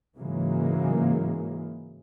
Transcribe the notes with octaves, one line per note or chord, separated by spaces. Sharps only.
G#2 C#3 E3 F#3 G#3 A#3